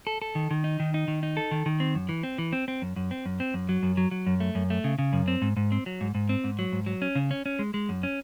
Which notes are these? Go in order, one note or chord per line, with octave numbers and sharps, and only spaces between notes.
A4
A4
D#3
D#3
D#4
D#3
D#4
D#3
D#4
A4
D#3
D#3
C4
F#2
E3
C4
E3
C4
C4
F#2
F#2
C4
F#2
C4
F#2
F#3
F#2
F#3
F#3
F#2
A3
F#2
A3
C#3
C#3
F#2
C4
G#2
G#2
C4
F#3
G#2
G#2
C4
G#2
F#3
G#2
F#3
C#4
C#3
C#4
C#4
G#3
G#3
F#2
C#4